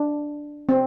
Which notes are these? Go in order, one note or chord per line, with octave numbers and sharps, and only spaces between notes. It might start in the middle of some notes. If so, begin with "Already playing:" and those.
Already playing: D4
C4